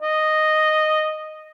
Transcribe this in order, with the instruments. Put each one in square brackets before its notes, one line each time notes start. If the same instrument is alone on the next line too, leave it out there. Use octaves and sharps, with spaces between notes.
[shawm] D#5